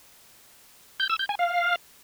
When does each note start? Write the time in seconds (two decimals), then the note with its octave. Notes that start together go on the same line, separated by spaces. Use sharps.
1.00 G6
1.10 E6
1.19 G6
1.29 G#5
1.39 F5